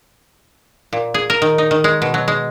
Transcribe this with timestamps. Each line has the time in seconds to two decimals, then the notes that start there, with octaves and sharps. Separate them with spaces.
0.93 A#2
1.14 G#4
1.30 A#4
1.42 D#3
1.58 D#4
1.71 D#3
1.84 G#3
2.02 B2
2.14 F#3
2.28 G#3